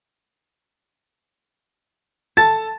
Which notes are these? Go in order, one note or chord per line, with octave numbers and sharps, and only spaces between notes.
A4 A5 A6